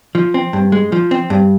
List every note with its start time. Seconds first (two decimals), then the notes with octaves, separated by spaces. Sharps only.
0.15 F3
0.34 C4
0.53 G2
0.72 G#3
0.92 F3
1.11 C4
1.30 G2